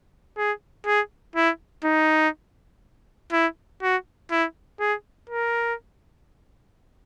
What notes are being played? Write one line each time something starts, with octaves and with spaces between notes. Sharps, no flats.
G#4
G#4
E4
D#4
E4
F#4
E4
G#4
A#4